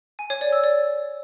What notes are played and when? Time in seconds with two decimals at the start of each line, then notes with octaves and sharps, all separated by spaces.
0.19 G#5
0.30 C#5
0.41 D5
0.52 E6
0.64 D5